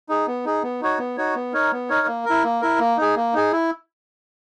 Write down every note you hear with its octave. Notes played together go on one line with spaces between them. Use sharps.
D#4 G#4
B3
D#4 G#4
B3
D#4 F#4 C#5
B3
D#4 F#4 C#5
B3
D#4 A#4 C#5
B3
D#4 A#4 C#5
A#3
E4 A#4
A#3
E4 A#4
A#3
D#4 G#4
A#3
D#4 G#4
E4